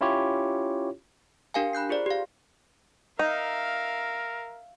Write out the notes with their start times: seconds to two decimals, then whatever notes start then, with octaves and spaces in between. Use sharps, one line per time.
0.01 C#4 E4 F4 G4 C#5
1.54 D4 G4 A#4 F5 G5 G#5
1.73 B5 F#6 G6 C7
1.89 F4 G#4 C5 D5
2.06 G4 F5
3.19 D#4 A#4 E5 F5